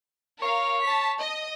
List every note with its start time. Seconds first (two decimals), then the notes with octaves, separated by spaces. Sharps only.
0.42 A#4 C#5 F5
0.82 A5 B6
1.20 D#5